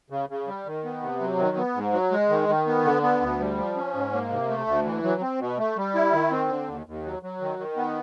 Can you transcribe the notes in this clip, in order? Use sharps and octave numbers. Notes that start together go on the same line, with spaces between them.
C#3
C#3
G3
D#3
B3
C3
F#3
D#3
B3
G#2
F#3
G#3
D#3
D#3
B3
D3
B3
D2
G3
F3
C#4
G#2
A#3
C3
A3
D2
E3
F#3
C4
B2
A3
G3
E4
D#3
C4
D3
D#2
D#2
F#3
F#3
D#3
D#3
B3